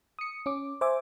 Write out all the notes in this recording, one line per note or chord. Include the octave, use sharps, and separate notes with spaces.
D#6 C#7
C#4 D6
C5 E5 G#5 D6